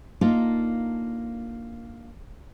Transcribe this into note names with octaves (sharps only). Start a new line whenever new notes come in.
A#3 D4 D#4 F4 A4 A#4